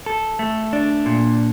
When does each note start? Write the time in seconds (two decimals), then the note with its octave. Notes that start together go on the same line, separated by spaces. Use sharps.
0.06 A4
0.39 A3
0.73 D4
1.06 A#2